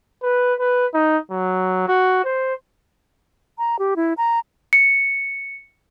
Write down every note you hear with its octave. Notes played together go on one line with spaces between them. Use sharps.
B4
B4
D#4
F#3
F#4
C5
A#5
G4
E4
A#5
C#7